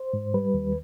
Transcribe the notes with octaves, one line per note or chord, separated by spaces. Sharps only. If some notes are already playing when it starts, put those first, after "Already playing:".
Already playing: C5
G#2
G3 B4
D#2